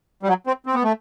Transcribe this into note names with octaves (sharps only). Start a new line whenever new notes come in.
G3
F#3
C4
C4
B3
A3